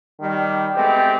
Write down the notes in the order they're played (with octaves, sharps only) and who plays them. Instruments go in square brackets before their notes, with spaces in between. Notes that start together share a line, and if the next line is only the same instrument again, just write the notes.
[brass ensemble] D#3 G3
G#3 A3 B3 C4 G4